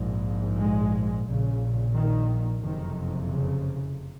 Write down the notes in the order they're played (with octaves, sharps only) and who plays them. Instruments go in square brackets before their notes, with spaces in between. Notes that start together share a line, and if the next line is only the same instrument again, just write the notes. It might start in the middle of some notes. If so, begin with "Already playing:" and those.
Already playing: [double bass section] A#1 G#2
G#3
A#1 A#2 C#3
D#3
F#1 F2 C3 D#3
C#3